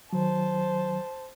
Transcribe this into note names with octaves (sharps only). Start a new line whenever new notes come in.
D#3 F#3 C5 A5